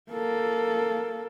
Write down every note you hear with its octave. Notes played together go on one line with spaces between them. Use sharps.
A#3 A4